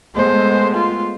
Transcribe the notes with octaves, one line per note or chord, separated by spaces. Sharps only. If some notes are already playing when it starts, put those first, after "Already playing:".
G#3 A3 B3 C5
F4